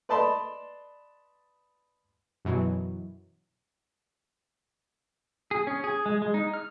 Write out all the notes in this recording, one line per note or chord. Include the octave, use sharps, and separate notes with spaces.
B4 D5 D#5 A5 B5 C6
F#2 B2 E3 F#3
G#4
C#4
G#4
G#3
G#3
D#4
F6